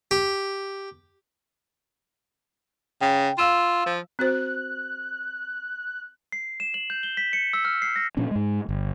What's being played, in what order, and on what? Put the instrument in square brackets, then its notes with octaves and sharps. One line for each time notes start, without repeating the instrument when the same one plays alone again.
[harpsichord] G4
[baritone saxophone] C#3 [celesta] G5
[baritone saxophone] F4 [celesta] F5 E6 E7
[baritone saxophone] F3
[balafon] C4 F#4 C5 [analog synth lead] F#6
[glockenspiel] C7
E7
F#7
G6
G7
B6
C#7
E6
F6
C7
A#6
[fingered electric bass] A#2 F3 C#4 D4
G#2 G#3
G1